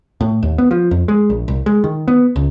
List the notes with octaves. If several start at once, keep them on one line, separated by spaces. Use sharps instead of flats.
A2
D#2
B3
F3
F2
G#3
A#1
C2
G#3
D#3
B3
C#2